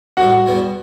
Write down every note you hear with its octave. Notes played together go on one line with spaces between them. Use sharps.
A1 A2 G3 F#4 F#5
E2 B2 G3 B3